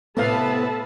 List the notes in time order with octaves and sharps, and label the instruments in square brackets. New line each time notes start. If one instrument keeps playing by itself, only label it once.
[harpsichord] A2 C3 [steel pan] A3 F5 [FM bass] B3 [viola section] A4 B4 A5